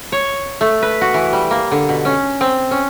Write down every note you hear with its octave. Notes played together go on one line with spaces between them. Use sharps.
C#5
A3
B4
F#4
E3
G3
A#3
D3
B2
C#4
C4
C#4